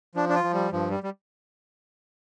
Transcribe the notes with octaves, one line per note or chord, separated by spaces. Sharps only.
F3 D4
D4
F4
F3
G3
G2 F3
G3
G3